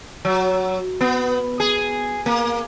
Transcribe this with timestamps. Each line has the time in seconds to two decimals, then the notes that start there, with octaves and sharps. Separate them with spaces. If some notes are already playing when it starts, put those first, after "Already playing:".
0.25 F#3
1.01 B3
1.60 G#4
2.26 A#3